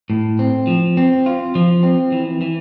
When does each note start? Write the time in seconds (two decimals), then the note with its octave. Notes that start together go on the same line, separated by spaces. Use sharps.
0.10 A2
0.39 C4
0.67 F3
0.97 C4
1.26 F4
1.55 F3
1.83 C4
2.12 E3
2.41 E3